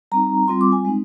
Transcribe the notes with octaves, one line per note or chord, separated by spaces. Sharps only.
G3 C4 D#4 A#5
G3 C4 F4 C6
D6
G#5
G#3 C4 D#4